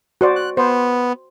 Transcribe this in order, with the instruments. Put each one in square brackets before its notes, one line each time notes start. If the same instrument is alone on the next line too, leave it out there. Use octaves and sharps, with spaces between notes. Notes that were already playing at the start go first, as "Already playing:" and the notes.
[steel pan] F#4 C5 D5
[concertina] F#6
[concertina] B3 [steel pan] C5